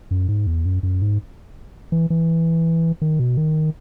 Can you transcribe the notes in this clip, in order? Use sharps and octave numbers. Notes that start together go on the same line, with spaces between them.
F#2
G#2
E2
F#2
F#2
G#2
E3
E3
D#3
B2
D#3